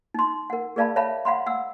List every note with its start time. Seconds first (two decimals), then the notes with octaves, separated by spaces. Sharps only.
0.14 D#4 C6
0.50 A#4 F#5
0.76 G#4 A#4 D5 F5 A5 B5
0.96 C#5 E5 F5 A5 B5
1.25 F5 F#5 B5 C6
1.46 F#5 E6